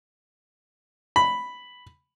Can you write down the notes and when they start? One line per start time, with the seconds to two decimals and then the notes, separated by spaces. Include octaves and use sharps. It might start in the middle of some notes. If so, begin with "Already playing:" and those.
1.16 B5